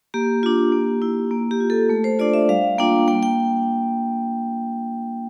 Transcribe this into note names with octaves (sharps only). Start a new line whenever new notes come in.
A#3 G4
D4 F4
A#3
E4
A#3
G4
F4
A4
A3 A4
C5
D4 F4 D5
E5
G3 F5
A#3 D4 F4 G5
A#3 G5
G5